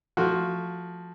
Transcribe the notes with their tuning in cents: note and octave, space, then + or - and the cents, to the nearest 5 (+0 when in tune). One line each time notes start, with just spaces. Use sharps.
F3 +5 A3 +0 F#4 +0